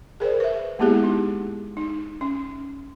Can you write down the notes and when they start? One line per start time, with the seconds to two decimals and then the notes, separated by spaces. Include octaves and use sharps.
0.20 G#4 A#4 C5 D5
0.40 B4 E5
0.79 G#3 A#3 B3 E4 G4 G#4
1.04 D#4
1.77 D#4
2.21 C#4